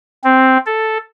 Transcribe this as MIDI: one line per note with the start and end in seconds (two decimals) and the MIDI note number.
0.24 0.57 60
0.66 0.98 69